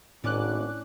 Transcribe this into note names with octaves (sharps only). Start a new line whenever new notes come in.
G#1 A2 C#4 D4 D6 F#6